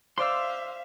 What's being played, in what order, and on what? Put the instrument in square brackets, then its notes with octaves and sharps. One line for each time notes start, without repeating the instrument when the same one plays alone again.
[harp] C5 D5 G6 [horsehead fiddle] E5 F5 [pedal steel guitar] C6 E6